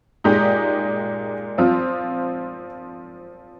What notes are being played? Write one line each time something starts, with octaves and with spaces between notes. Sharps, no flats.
A#2 G#3 D#4 G4
F3 C4 F4